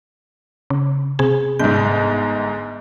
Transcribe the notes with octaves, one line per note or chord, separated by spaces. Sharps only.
C#3
C3 G#4
G1 G#2 G6